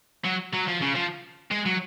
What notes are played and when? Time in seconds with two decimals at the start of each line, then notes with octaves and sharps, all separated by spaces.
0.25 F#3
0.53 F#3
0.67 F3
0.81 C#3
0.95 F3
1.51 G#3
1.66 F#3